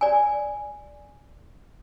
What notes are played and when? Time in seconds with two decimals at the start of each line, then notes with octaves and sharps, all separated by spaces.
0.01 D5 G#5